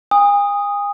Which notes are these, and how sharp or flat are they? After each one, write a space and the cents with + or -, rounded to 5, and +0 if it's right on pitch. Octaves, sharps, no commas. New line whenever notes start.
G#5 -40 D#6 +0